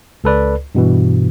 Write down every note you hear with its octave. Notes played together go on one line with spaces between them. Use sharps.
C#2 A4 B4 D5
G2 B2 E3